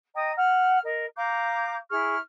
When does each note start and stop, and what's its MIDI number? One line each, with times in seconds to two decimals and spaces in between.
0.15 0.31 75
0.15 0.31 79
0.15 0.31 82
0.15 0.31 87
0.36 0.79 78
0.36 0.79 89
0.84 1.06 70
0.84 1.06 75
1.16 1.75 77
1.16 1.75 82
1.16 1.75 86
1.16 1.75 91
1.90 2.16 64
1.90 2.16 68
1.90 2.16 85
1.90 2.16 89